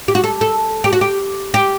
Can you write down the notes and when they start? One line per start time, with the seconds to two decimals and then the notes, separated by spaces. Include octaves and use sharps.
0.08 G4
0.15 F#4
0.24 A4
0.41 A4
0.84 G4
0.93 F#4
1.01 G4
1.54 G4